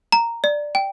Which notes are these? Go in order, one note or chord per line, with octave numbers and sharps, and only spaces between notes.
A#5
D5
G5